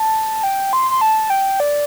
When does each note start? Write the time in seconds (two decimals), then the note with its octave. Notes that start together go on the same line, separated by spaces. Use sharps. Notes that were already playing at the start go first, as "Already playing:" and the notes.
Already playing: A5
0.43 G5
0.73 C6
0.90 C6
1.01 A5
1.30 G5
1.60 D5